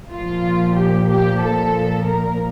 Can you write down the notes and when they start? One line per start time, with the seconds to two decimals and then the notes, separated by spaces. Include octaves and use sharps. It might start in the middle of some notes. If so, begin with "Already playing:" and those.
0.11 A#2 F3 F4
0.76 G4
1.09 G4
1.42 A4
2.06 A#4